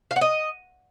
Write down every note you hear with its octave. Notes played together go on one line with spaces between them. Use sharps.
F5
F#5
D#5